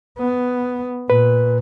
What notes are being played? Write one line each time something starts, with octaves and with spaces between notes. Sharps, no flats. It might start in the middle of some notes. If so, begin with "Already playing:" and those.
B3
A#2 B4